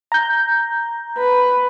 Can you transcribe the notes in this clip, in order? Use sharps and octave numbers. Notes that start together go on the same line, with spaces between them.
A#5 G6
B4